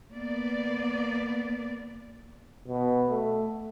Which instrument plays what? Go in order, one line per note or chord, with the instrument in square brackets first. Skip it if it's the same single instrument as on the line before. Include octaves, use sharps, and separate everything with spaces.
[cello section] A#3 B3 D5
[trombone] B2
A3